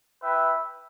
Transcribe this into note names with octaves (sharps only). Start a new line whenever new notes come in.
E4 B4 E5 G5